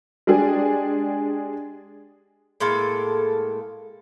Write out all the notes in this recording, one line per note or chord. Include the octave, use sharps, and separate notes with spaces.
G#3 D4 G4 G#4
A2 G#3 A#3 A4